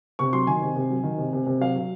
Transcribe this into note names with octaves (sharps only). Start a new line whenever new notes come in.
C3 C#6
F#3 C6
D#3 G#5
C3
C3
F#3
D#3
C3
C3
C3
F#3 F5
F#3